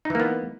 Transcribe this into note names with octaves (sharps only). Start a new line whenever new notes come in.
E3 A#3 B3 D#4